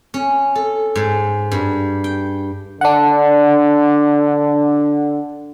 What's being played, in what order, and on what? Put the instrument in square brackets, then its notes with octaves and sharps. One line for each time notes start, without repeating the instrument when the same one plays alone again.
[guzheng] C#4
A4
G#2
G2
G5
[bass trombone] D3 [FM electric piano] D4 F#5